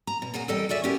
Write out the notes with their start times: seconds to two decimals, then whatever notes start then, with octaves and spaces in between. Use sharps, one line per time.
0.07 A#5
0.22 B2
0.34 A#2 F#3 F#4 G#4
0.48 E2 G3 A4 D5 D#5 G5
0.69 F#4 G#4 D5 E5
0.84 B3 C#4 E4 G4 A#4